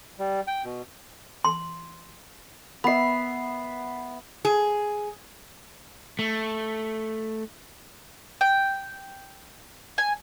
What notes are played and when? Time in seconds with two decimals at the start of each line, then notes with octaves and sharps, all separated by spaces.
0.19 G3
0.47 G5
0.64 B2
1.45 C6
2.84 B3 E5 B5 C7
4.45 G#4
6.19 A3
8.41 G5
9.98 G#5